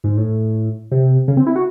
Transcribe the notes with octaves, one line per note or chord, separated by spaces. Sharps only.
G#2
A2
C3
C#3
C4
E4
F#4